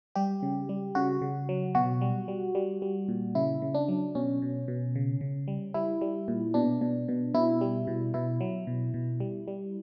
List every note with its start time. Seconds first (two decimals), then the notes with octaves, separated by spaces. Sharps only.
0.15 G3 G4
0.43 C#3
0.69 G3
0.95 C#3 F#4
1.22 C#3
1.49 F#3
1.75 B2 F#4
2.01 G3
2.28 G3
2.55 G3
2.82 G3
3.09 A#2
3.35 C#3 E4
3.62 C#3
3.75 D4
3.88 F#3
4.15 B2 C#4
4.42 B2
4.68 B2
4.96 C#3
5.21 C#3
5.48 G3
5.74 G3 E4
6.01 G3
6.28 A#2
6.54 B2 D4
6.81 B2
7.08 B2
7.34 B2 E4
7.61 G3
7.87 B2
8.14 B2 E4
8.41 F#3
8.67 B2
8.94 B2
9.20 G3
9.48 G3